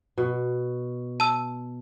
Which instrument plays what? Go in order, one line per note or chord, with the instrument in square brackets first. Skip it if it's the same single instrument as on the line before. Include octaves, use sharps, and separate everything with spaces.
[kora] B2
[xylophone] A5 E6